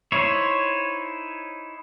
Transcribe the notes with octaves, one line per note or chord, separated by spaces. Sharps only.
D#4 E4 C5 C#5